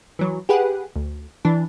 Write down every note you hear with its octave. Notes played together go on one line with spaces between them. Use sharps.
E3 F#3
G4 G#4 B4 F#5
D2
E3 D4